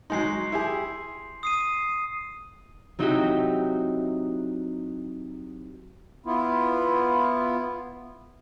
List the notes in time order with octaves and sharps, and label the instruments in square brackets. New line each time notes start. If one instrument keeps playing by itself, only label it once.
[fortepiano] F#3 G#3 D#4 [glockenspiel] C6 C7
[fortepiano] E4 G4 G#4
[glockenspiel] D#6 C7 D#7
[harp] F#3 C4 D#4 E4 F#4 G4
[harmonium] B3 E4 F4